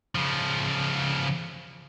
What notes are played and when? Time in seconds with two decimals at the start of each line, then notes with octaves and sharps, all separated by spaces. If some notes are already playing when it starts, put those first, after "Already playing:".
0.15 C#3 F3